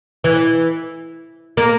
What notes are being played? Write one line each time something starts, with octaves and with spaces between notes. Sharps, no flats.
E3
A#3